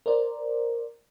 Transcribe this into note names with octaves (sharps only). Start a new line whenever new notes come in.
A#4 C5 D5